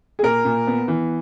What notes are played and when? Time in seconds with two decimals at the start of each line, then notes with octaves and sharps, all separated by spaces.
0.19 G#4
0.23 A#2 A#4
0.45 A#2
0.67 B3
0.88 E3